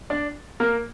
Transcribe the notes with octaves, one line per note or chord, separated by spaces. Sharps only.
D4 D5
A#3 A#4